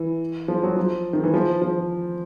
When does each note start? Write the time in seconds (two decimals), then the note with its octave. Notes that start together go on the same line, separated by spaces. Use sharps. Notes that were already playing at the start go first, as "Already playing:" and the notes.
Already playing: E3
0.48 F3
0.63 F#3
0.77 F3
1.13 D#3
1.23 E3
1.34 F3
1.62 F3